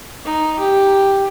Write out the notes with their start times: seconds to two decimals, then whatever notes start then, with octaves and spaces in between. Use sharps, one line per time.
0.25 D#4
0.59 G4